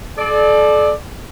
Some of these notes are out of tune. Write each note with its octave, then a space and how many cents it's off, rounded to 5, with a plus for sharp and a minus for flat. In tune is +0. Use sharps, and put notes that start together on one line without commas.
A4 -35 D5 +15